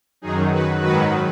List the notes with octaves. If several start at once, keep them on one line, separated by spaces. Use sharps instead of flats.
F#2 D#3 F#3 D#4 G#4
F#4 B4
G#2 D#3 F#3 F#4 B4